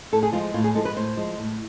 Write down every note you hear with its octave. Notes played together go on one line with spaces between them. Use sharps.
A2 A4
G#4
F3 G#3 F4
A2 F4
G#4
F3 G#3 A4
B4
A2 C5
F3 G#3
A2